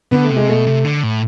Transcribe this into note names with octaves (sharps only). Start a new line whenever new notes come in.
D3 B3
A3
C3
G#3
B2 A3
C3
D3
A2